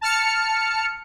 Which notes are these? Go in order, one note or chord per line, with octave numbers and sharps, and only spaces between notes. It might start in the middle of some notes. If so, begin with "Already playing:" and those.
A5 F6 C#7